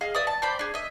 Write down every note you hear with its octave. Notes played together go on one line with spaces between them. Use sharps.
G#4 D#5 F5
D5 E5 D#6
A5
C5 D5 G5 B5
D4 G#4
D#5 E5